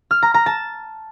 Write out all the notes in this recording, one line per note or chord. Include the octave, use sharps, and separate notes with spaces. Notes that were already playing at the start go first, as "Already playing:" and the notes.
F6
A#5
A#5
A5